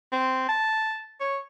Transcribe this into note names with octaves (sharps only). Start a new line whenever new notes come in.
C4
A5
C#5